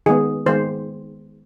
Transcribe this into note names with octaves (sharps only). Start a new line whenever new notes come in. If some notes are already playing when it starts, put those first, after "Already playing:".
D#3 G#3 B3 G#4
D#3 G#3 B3 C5